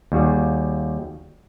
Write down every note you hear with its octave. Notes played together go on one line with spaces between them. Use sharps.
D#2 G3 F#4 G#4